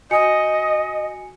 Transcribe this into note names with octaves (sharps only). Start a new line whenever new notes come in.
F#4 D#5 G#5 C#7